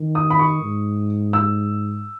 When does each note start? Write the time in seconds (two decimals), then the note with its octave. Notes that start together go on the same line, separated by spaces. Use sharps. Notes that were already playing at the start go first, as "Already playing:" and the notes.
Already playing: D#3
0.15 D#6
0.30 B5
0.39 C#6
0.62 G#2
1.33 E6